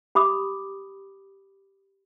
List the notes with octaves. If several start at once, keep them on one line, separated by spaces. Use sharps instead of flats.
G4 B5 D6 D#6